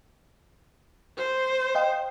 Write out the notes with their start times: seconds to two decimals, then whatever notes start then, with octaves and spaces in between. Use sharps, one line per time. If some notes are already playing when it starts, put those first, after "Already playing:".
1.18 C5
1.75 D#5 F5 G5